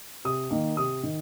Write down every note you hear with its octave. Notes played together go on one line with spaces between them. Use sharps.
C3 D#6
D#3 A#3
C3 D#6
D#3